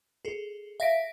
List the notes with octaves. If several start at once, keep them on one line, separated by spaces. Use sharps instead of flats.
G#4 A4
E5 F5 A#6 B6 D7